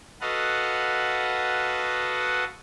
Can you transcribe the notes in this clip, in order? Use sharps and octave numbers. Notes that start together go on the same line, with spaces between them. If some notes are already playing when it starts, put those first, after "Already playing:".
F#4 A4 B4 D#5 F5 F#5